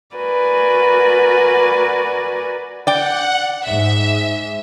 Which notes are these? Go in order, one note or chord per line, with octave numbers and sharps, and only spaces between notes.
F#4 A#4 B4 D5 G#5
D5 F#5 G5
G#2 E5